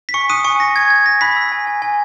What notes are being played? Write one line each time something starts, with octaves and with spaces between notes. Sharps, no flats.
B6
G#5 C#6 C#7
D#6 F#6 D#7
G#5 C#6 C#7
G#5 A#6
G#5 G#6
C#6 G#6
G#5 A#6
B5 F#6 B6
E6
G#5
G#5
G#5